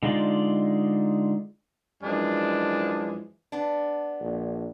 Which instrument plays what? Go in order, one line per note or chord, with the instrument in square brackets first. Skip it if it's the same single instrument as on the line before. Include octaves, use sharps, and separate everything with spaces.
[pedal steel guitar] D3 G#3 D#4 F4 D5
[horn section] F#2 E3 F3 G#3 D4
[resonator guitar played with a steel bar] B3 D4
[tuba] A#1